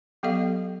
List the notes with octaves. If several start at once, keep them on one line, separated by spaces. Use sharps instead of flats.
F#3 B3 G4 A4 D#5 F5